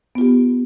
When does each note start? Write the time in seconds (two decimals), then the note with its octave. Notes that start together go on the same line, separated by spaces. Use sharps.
0.15 B3
0.18 F4
0.21 G4